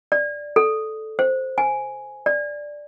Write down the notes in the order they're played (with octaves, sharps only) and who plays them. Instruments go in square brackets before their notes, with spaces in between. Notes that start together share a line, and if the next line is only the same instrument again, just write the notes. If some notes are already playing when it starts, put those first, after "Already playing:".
[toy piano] D5
A4
C5
G#5
D5